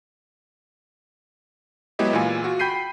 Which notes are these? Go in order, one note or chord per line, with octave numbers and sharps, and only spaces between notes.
F#3 G#3 B3 E4 G4 D#5
A#2 E3 F4 G#5
F4 F#4
G5 B5 G6 B6 C7 D#7